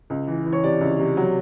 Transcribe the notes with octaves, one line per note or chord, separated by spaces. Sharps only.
C#2
E3
E3
C#5
C3 D5
C#2
C3
F#3